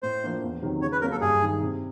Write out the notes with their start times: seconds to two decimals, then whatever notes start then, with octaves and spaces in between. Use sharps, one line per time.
0.03 A2 C5
0.23 F3 A#3 D4
0.43 E2
0.62 C3 D#3 F#3
0.82 C#3 C#5
0.92 B4
1.01 F#3 A#3 C#4 A#4
1.12 A4
1.21 G2 G#4
1.42 D#3 G#3
1.61 C3